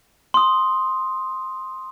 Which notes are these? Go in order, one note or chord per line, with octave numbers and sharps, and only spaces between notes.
C6 D#6